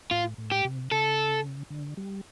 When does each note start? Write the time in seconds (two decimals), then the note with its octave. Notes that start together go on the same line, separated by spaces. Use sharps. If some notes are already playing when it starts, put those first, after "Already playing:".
0.11 A2 F4
0.38 A2
0.52 G4
0.65 C3
0.91 C#3 A4
1.70 D3
1.97 G3